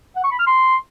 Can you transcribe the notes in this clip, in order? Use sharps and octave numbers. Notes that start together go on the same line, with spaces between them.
F#5
C#6
B5
F6
C6